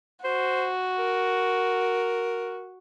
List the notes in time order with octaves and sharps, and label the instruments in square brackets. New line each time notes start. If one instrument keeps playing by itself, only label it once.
[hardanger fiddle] F#4 [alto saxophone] C5
[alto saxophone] A#4